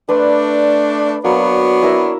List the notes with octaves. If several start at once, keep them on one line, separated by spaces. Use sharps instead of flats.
A3 D4 B4 D5 C6
F#3 A#3 B3 D4 C#5 B5
E4 A#4 E5